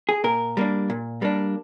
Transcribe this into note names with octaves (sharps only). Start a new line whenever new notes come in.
G#4
A#2 A#4
G3 A#3 D4
A#2
G3 A#3 D4